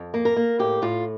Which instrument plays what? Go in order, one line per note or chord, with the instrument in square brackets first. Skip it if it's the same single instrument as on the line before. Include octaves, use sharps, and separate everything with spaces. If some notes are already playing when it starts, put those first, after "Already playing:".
Already playing: [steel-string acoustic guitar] F2
A#3
A#4
A#3
A2 G4
A2 F4